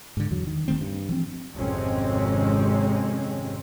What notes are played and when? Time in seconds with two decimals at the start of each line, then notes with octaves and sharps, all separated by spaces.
0.17 G#2 D3
0.31 E2 D3 F#3
0.47 D#3
0.68 D1 D#3 A3 C4
0.81 G2
1.09 E3 F3 C4
1.55 G#1 F2 C3 G#3 C4 C#4